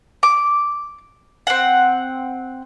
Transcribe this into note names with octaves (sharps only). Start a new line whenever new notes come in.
D6
C4 F#5